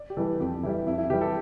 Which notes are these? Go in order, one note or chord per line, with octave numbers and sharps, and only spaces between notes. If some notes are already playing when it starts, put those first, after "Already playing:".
Already playing: D5
G4
E3 G3 A4
F2 G4
E3 G3 E4
F2 E4
E4
E3 G3 G4
A4